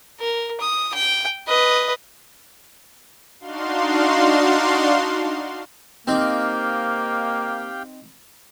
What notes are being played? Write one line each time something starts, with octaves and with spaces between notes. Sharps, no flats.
A#4
D#6
G5
B4 D#5
D4 D#4 F#4 F5 C6
A#3 C4 D#4 G4 F5 G5